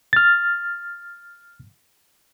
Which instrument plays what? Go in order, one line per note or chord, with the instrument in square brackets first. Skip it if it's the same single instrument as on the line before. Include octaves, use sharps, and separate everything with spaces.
[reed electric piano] F6 A6